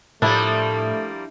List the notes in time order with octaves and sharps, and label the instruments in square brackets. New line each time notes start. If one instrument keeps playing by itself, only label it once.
[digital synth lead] A2 [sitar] F3 G3 A#3 [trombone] A3 [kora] D4 E4